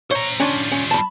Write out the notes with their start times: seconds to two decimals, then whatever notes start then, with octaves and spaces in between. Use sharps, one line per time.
0.11 C5 C#5 A#5
0.40 G3 C#4 D4 F4
0.72 C#4
0.91 A5 B5